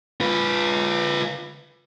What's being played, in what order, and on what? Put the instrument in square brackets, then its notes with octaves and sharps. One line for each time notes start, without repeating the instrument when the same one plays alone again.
[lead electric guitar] F4 B4